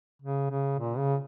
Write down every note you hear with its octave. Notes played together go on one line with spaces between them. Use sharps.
C#3
C#3
A#2
C#3